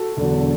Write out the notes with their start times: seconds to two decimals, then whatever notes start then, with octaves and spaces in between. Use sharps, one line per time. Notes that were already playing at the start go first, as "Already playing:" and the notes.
Already playing: F#4 A4
0.17 E1 E2 D3 F#3